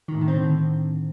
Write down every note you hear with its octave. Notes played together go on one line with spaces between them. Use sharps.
D#3
A2
D#3
C4
D3